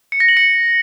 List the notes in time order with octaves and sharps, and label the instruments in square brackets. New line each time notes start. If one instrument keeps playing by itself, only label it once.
[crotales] C#7
A#6
F#7
C#7